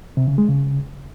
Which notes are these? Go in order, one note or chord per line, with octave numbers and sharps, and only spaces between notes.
C3
C#3
G#3
C#3